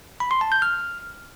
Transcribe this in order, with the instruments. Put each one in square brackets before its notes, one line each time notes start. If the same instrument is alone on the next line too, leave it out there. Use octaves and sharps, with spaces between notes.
[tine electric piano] B5
C6
A5
G6
F6